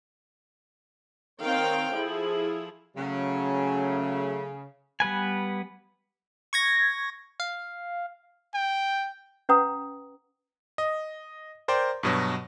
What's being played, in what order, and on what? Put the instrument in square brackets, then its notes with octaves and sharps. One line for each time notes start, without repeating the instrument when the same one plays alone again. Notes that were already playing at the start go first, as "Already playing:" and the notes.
[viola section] D#3 C4 C#5 F5 G5
F3 E4 G#4 A4
[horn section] C#3 [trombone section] F#3 A3
[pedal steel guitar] G3 B3 B4 G#5
[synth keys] C#6 G#6 A#6
F5
[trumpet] G5
[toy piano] C#4 B4 F#5 G5 A#5 D#6
[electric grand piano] D#5
A#4 C5 D5 G5
G2 B2 F#3